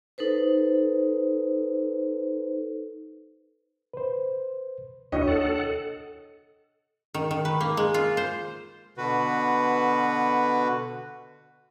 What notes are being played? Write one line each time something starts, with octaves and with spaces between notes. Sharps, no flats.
D#4 A4 B4 C5
B4 C5
D#2 D4 E4 F#4 C#5 D#5 G5
A4 F#5
D#3
D#3
B4
A#3
G#3
F4
C5
B2 D3 F#4 B4